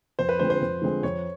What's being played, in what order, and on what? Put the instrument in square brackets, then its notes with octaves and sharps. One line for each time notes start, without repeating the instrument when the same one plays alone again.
[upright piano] F2 [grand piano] C5
[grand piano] B4
[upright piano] D3 F3 G#3 C4 [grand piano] C5
[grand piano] C5
[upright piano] F2
D3 F3 G#3 C4
[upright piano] F2 [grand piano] C#5